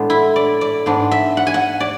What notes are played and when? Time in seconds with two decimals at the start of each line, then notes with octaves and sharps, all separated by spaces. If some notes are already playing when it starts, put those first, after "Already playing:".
Already playing: A2 G#3 B3 D4
0.10 E4
0.36 D5
0.61 D5
0.86 G#2 G#3 B3 D4
1.11 E5
1.37 F#5
1.47 G#5
1.54 F#5
1.80 D5